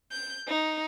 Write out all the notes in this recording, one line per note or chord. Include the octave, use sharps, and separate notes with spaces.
G6
D#4